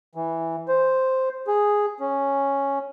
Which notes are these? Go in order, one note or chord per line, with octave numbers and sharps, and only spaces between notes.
E3
C5
G#4
C#4